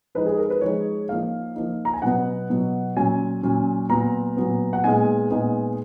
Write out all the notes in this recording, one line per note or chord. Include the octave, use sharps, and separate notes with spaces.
F3 G#3 D#4 B4
G#4
A#4
B4
F3 G#3 D#4 C#5
F3 A#3 D#4 F5
F3 A#3 D#4
A#5
G#5
B2 F#3 B3 F#5
B2 F#3 B3
A#2 F#3 C#4 G#5
A#2 F#3 C#4
A#2 F#3 B3 A#5
A#2 F#3 B3
F#5
A#2 G#3 B3 D#4 G#5
A#2 G#3 B3 D#4